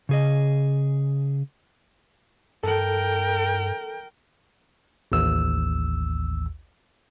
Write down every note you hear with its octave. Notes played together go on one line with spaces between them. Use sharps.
C#3 G#4 D#5
G2 A4 A#4 G5
A1 D#2 E6